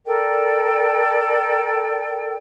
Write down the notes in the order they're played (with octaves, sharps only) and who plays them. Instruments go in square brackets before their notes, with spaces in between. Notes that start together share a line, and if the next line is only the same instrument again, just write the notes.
[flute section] A4 A#4 D5 G5